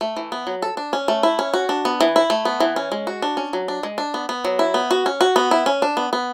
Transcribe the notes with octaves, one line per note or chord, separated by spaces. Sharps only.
A3
E3
B3
F#3
A4
D4
C#4
A3
E4
C#4
F#4
D4
B3
E3
E4
A3
B3
E3
C#4
G#3
F#4
D4
C#4
F#3
D4
G#3
D4
B3
B3
F#3
E4
B3
F#4
C#4
F#4
B3
E4
C#4
D4
B3
B3